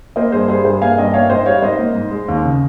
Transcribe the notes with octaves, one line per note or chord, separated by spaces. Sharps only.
A#3 C5 D#5
G2 G#4 C5
G3 G#4 C5
G2 G#4 C5
A#3 F5 G#5
G2 D#5 G5
A#3 C#5 F5
G#2 C5 D#5
G3 C#5 F5
G#2 C5 D#5
A#3
G#2
G#3
D#2
C#3